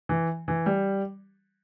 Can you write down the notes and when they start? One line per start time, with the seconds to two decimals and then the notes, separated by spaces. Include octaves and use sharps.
0.09 E3
0.48 E3
0.66 G3